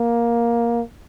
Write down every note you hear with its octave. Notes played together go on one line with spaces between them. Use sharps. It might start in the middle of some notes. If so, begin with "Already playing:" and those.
Already playing: A#3